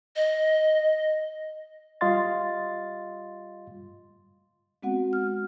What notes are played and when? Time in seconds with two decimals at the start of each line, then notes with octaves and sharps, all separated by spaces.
0.16 D#5
2.01 G3 F4 D#5 F5 C6 A6
4.83 G#3 B3 C4 F#4 F#5
5.13 F6